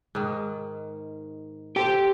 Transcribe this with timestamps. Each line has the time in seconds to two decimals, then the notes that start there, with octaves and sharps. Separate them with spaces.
0.15 G#2 D#3
1.76 G4 A4 C5 G5